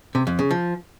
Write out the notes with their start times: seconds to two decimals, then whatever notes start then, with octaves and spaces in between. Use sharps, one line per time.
0.15 C3
0.27 F2
0.39 C#3
0.51 F3